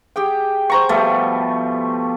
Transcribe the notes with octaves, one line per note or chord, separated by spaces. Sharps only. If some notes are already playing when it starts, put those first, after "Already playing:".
G4 G#4 G5
C5 A#5 C#6
B2 F3 G3 A3